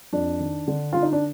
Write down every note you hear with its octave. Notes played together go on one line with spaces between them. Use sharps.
F2 D4
D#3
D3
D3 F4
D#4
D4